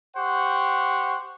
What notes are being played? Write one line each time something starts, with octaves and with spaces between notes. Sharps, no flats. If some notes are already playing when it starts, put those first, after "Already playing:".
G4 C5 F#5 C#6